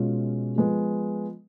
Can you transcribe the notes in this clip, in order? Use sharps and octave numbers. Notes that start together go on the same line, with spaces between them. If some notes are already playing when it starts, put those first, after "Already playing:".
Already playing: B2 G#3 C#4 F4
F3 G#3 B3